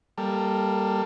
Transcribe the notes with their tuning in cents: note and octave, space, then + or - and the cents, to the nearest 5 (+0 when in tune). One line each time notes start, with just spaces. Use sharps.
G3 +0 A#3 +0 A4 +15